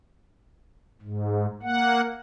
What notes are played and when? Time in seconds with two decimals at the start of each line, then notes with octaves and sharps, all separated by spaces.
1.01 G#2
1.63 A#3 F#5